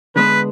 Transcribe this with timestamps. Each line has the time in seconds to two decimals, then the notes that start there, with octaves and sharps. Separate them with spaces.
0.16 D3 G#3 B3 D4 B4